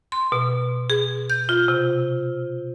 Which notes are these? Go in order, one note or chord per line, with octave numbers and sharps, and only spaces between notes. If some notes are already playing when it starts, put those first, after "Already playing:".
C6
B2
G#4
G6
F4
C3